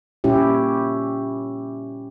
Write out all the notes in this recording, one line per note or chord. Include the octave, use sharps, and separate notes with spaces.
A#2 G3 C#4 E4 G4